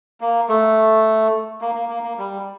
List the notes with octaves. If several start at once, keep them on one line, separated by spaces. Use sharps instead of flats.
A#3
A3
A#3
A#3
A#3
A#3
G3